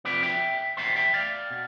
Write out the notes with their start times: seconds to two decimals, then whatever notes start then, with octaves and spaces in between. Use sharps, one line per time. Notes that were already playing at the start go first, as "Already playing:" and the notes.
0.05 F2 C3 F3 B4 D5
0.23 E5 G5
0.77 E2 B2 G3 B3 C5 E5
0.96 E5 G5
1.14 D5 F5
1.51 B2